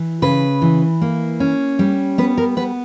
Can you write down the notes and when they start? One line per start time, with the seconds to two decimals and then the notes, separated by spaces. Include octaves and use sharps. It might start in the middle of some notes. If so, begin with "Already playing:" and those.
Already playing: E3
0.22 C#3 B4
0.62 E3
1.02 A#3
1.40 C#4
1.79 G3
2.18 B3 B4
2.37 A#4
2.57 B3 B4